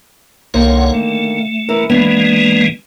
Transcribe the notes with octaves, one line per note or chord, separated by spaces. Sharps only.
C2 D3 D#3 A#3 C#5 F#5
A3
E3 A#4
E3 G#3 A#3 B3 D4